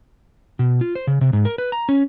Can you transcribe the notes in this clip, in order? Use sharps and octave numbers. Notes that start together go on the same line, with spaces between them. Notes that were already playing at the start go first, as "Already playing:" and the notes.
B2
F4
C5
C#3
C3
G#2
A#4
B4
A#5
C#4